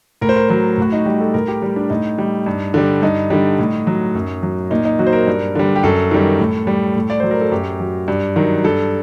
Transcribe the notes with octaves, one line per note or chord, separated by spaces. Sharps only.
A2 A#4
C5
A#4
F#3 C5
A2 F#4
D#4
G3 G4
A4
A2 A#4
G4
G3
D4
A2 D#4
G3
G2
D3 G3
G2 D#4
D3 G3
A2
F#3
F#2
F#3
A#2 D#4
D#4
F#3 F#4
C5
A#4
G2
D3 G3
G4
F#2 A4
D#3 G3
A2
G3
A2
D5
F#3 C5
A#4
A4
F#2 G4
F#3
G2
D#3 F#3
G2 A4